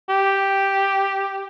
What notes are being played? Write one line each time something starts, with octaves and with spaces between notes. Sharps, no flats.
G4